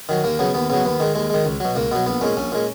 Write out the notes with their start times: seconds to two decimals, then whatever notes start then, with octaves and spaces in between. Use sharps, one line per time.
0.09 D#3 F#3
0.24 D#2 A#3
0.39 C#3 F#3 B3
0.54 D#2 B3
0.70 C#3 F#3 B3
0.85 D#2 B3
1.00 D#3 G#3
1.15 D#2 G#3
1.30 D#3 G#3
1.45 C#2
1.60 B2 F#3
1.75 C#2 A#3
1.91 B2 F#3 B3
2.06 A#1 B3
2.21 A#2 G#3 C#4
2.37 A#1 C#4
2.52 A#2 G#3